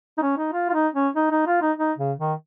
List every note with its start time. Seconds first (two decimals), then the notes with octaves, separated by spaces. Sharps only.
0.17 D#4
0.22 C#4
0.37 D#4
0.53 F4
0.69 F4
0.73 D#4
0.94 C#4
1.16 D#4
1.31 D#4
1.47 F4
1.61 D#4
1.78 D#4
1.98 C#3
2.19 D#3